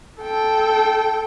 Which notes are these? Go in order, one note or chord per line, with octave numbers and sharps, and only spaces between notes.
A4 G5